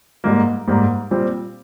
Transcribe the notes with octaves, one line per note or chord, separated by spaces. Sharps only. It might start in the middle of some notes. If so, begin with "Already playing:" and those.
G#2 G3 A#3
G#2 G3 A#3
A#2 G3 C4